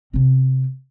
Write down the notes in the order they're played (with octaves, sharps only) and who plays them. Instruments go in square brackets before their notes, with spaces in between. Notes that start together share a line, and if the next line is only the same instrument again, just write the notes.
[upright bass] C3 C4